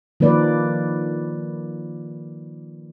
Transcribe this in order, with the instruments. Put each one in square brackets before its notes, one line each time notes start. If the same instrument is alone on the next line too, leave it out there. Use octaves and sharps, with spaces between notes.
[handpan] D#3 F3 A#3 B4 D5